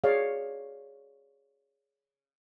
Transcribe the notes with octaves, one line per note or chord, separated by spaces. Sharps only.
G#4 C#5 D5 F5